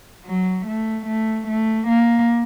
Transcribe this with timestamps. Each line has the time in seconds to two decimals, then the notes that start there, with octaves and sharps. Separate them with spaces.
0.24 F#3
0.65 A3
1.05 A3
1.47 A3
1.87 A#3